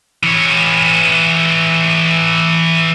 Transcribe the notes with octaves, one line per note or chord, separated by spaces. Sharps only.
E3 C#5